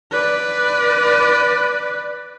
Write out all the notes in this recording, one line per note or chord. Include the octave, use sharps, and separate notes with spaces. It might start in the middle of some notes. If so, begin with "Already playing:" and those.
B4 D5